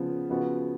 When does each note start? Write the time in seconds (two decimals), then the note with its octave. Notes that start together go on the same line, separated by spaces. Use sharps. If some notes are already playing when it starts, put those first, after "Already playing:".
Already playing: C#3 F3 B3
0.30 C#3 F3 B3 F#4